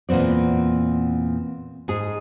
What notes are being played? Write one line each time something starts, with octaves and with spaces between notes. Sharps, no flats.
E2 A#2 B3 C4 D5
G#2 G#4